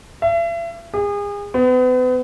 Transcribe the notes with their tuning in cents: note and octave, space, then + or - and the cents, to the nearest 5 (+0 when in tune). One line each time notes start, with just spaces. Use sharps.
E5 +40
G#4 -35
B3 +40